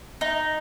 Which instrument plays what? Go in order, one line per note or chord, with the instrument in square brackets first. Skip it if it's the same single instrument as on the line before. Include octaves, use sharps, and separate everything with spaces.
[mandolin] D#4